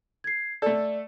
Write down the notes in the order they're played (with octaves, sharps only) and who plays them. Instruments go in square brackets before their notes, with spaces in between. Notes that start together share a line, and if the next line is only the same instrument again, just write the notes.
[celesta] G#6 C7
[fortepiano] A3 A4 [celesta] D5